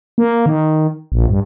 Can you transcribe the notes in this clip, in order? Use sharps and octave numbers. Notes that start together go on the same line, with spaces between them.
A#3
D#3
A#1
G2